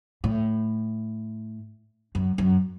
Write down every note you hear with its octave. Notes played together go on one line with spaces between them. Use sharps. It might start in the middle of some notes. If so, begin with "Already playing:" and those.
A2
F#2
F#2